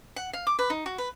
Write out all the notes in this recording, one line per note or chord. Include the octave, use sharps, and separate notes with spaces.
F#5
F5
D6
B4
D#4
F#4
B4